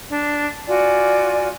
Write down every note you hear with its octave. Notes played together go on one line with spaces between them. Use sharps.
D4
F4 F#4 D5 G#5